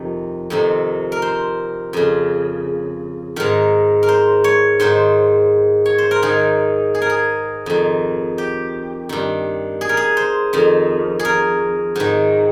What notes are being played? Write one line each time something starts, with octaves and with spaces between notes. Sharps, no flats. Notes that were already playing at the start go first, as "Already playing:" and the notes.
Already playing: F2 C3 D#3
F2 C3 D#3
A#4
C5
F2 C#3
G#2 D#3 A#4
A#4
C5
C#5
G#2 D#3 C5
C#5
C5
A#4
G#2 D#3 G#4
G#4
A#4
G#4
F2 D#3
G4
G2 D#3
G#4
A#4
G#4
C5
F2 D#3
G#4
A#4
G#2 D#3